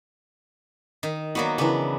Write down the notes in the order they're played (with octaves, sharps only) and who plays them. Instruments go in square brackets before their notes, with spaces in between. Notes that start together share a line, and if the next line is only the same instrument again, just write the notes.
[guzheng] D#3
[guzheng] F#3 A#3 B3 [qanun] F#4 D5
[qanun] C#3 E3 [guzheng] B3 D4